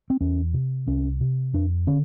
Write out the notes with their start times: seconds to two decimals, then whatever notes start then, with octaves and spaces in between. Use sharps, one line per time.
0.10 C4
0.20 E2 C#4
0.54 C3
0.87 C2 C#4
1.20 C3
1.53 F2 D4
1.87 D3 C#4